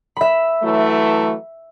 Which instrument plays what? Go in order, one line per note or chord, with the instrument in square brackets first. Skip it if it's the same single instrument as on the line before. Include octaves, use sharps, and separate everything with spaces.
[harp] E5 B5
[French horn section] E3 F#3 A3